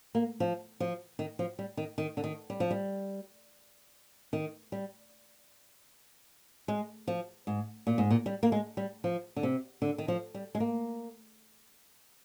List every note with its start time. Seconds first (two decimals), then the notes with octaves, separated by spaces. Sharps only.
0.15 A#3
0.40 F3
0.80 F3
1.19 D#3
1.39 F3
1.59 G3
1.77 D#3
1.98 D#3
2.17 D3
2.24 D#3
2.50 G3
2.60 F3
2.71 G3
4.33 D#3
4.72 G3
6.68 G#3
7.08 F3
7.47 G#2
7.87 A#2
7.98 G#2
8.11 A#2
8.26 G3
8.43 A#3
8.52 G#3
8.77 G3
9.04 F3
9.36 D3
9.43 C3
9.82 D3
9.98 D#3
10.08 F3
10.34 G3
10.55 G#3
10.60 A#3